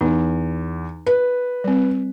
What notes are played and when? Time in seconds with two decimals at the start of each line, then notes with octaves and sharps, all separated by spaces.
0.01 E2 D#4
1.07 B4
1.64 G3 C4